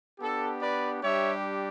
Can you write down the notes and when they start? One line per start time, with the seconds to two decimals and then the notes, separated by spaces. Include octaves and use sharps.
0.19 B3 D4 G4 A4
0.61 B4 D5
1.03 G3 D4 G4 C#5 E5